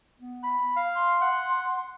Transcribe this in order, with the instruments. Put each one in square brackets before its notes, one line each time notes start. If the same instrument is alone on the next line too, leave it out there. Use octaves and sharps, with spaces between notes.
[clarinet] B3
[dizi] B5
[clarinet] F5
[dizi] C6
[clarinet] F#5